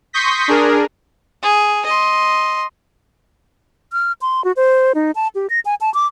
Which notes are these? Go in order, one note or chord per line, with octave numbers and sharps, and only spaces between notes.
C6 C#6 D#6 G6 A#6 B6
D4 G#4 A#4
G#4
D#5 C6
F6
C6
F#4
C5
D#4
A5
G4
A#6
G#5
A5
D6